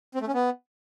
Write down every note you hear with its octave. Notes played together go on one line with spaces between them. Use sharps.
C4
A3
C#4
B3